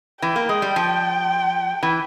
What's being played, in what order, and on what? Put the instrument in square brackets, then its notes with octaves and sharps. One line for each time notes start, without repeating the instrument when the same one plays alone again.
[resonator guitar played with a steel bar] E3 [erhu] G5
[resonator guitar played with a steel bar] A#3
G#3
G3
F3
E3